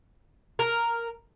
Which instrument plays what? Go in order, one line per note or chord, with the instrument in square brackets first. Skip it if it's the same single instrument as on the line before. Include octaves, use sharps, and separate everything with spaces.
[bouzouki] A#4